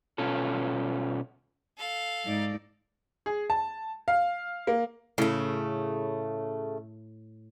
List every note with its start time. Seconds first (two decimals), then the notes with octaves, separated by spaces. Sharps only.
0.18 B2 C#4 F4 A4
1.78 A4 F5
2.24 G#2 D#4 D5
3.26 G#4
3.50 A5
4.08 F5
4.67 A#3
5.18 A2 C#3 A3